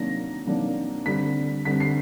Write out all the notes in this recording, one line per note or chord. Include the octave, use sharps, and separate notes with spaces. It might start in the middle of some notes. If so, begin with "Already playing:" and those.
Already playing: C3 D#3 F#3 A#3 D4 A#6
C3 D#3 F#3 A#3 D4
D3 G3 C4 B6
D3 G3 C4 B6
C7